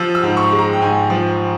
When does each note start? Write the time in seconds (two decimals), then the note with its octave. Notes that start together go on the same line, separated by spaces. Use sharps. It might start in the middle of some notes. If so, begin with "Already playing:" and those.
Already playing: F3 E6
0.15 E6
0.23 G#2
0.37 C#6
0.52 G#3
0.59 A#5
0.73 G5
0.81 G#2 G#5
1.10 F3